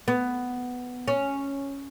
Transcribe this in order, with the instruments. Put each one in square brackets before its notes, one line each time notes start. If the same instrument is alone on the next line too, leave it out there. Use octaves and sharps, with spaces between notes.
[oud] B3
C#4